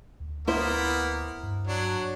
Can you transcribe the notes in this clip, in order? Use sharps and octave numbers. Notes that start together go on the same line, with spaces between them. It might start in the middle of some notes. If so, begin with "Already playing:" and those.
D2
A#3 B3 E4 C5
G2
F#3 D4